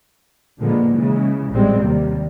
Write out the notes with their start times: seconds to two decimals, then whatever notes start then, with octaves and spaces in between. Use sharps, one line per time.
0.58 A#2 D3 F3 G#3 A#3 B3
0.92 C#3 E3 G#3
1.50 A1 A#2 G3 G#3 C4
1.80 D#2 C3 G3 A#3